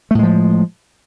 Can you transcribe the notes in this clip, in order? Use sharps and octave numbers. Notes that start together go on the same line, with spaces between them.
A2 F3 G#3 A3